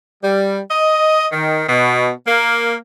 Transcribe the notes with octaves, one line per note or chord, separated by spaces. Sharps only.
G3
D#5
D#3
B2
A#3